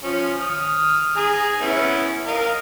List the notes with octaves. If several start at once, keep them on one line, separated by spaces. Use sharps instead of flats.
F3 C#4
D#6 F6
G#4 G#5 A#5
B3 C#4 E4
A#4 D#5 F5